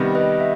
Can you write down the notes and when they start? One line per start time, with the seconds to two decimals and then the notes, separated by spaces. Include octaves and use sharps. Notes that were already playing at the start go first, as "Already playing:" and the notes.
Already playing: C3 D#3 G3 B3
0.15 B4 D#5
0.40 E5